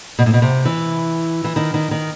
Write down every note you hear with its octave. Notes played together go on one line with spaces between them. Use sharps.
B2
A2
B2
C3
E3
E3
D#3
D#3
D#3